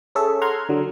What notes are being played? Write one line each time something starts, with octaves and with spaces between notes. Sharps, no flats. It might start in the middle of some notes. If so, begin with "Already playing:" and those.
C#4 G#4 A4 E5
F#5 A#5 C6 F6 G#6
D3 F#3